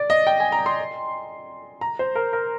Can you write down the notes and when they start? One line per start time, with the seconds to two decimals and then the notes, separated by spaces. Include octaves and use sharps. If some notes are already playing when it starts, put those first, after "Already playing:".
Already playing: D5
0.10 D#5
0.27 G5
0.40 G#5
0.52 A#5
0.66 C6
1.81 A#5
1.99 C5
2.15 A#4
2.33 A#4